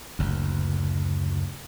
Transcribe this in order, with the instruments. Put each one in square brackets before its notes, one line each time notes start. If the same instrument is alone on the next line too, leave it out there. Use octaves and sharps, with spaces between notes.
[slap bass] F#1 D2